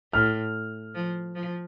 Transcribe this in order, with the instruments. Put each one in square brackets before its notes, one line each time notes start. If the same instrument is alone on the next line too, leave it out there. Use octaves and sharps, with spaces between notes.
[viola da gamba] A2 [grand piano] F6
[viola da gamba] F3
F3